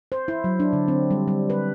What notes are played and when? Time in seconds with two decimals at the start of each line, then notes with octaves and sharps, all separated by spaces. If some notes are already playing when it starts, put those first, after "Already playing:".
0.12 C5
0.28 E4
0.44 F#3
0.60 D4
0.73 D3
0.88 C4
1.11 G3
1.28 G3
1.50 B4